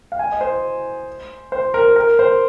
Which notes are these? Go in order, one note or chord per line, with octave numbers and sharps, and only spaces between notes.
F5
G#5
D#5
C5
C5
A#4
A#4
C5